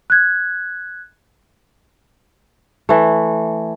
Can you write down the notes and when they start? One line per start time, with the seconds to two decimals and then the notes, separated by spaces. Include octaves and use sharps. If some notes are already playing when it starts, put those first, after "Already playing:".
0.10 F#6 G#6
2.89 E3 A3